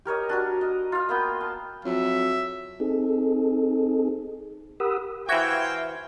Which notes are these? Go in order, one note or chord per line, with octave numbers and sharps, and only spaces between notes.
G4 A#4 C#5 D#5
D4 F#4 A#4
D#5
F4 F5
A#3 B3 G5
A5
F2 F#3 E5
C4 D#4 G#4 A4
G4 A#4 F#5 B5 D#6 E6
E3 F#4 C5 E5 F5 G5 G#6